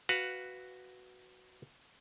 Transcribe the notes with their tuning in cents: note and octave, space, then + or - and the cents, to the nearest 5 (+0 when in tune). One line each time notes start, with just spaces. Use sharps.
F#4 +0 B4 +5 F5 +5